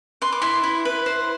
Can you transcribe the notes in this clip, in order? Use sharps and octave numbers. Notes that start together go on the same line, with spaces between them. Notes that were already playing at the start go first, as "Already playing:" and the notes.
B4 C6
D6
E4 C6
E4
B4
C5